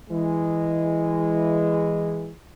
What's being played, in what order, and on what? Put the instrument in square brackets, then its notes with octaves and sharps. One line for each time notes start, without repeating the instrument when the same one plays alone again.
[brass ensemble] E3 G#3